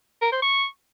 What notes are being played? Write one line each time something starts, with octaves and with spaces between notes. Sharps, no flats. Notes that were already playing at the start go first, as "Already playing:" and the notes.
A#4
C5
C#6